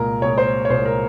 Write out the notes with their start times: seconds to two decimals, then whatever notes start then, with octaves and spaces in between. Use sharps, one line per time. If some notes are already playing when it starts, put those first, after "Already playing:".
Already playing: C2 A#2 G#3 A#4
0.21 C2 A#2 G#3 C#5
0.38 C5
0.65 C#5
0.70 C2 A#2 G#3 C5
0.85 A#4